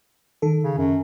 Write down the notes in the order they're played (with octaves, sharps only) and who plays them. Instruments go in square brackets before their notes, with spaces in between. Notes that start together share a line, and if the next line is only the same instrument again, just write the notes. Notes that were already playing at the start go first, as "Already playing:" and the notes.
[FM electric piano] D#3 A4
[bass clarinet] C#3
F#2